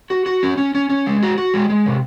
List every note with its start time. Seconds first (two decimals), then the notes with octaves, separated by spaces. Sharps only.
0.10 F#4
0.26 F#4
0.43 C#4
0.57 C#4
0.75 C#4
0.90 C#4
1.06 G#3
1.22 F#4
1.38 F#4
1.54 G#3
1.70 G#3
1.86 C3